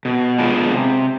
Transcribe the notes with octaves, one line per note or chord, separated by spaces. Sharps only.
B2
G#3 B3 D4 F4
C3